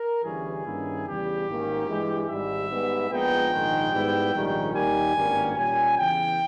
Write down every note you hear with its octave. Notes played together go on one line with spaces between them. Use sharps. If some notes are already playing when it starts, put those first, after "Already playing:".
Already playing: A#4
G1 G2 E3 G3 C#4 G#4
G2 D#3 A#3 C#4 E4
E2 C#3 G3 G4
G#1 G#2 D#3 A#3 C#4
G2 E3 G#3
G#1 G#2 G3 E5
G#2 G3 B3
A#1 A#2 G#3 B3 D#4 G5
A#1 G#2 D#3 G#3
G#2 G3 B3 E4
A#1 G#2 D#3 G3 C#4
D#2 D#3 G3 A#3 G#5
G#1 G2 G3 A#3 C#4
A#2 G3 C#4 G#5
E2 C#3 E3 G5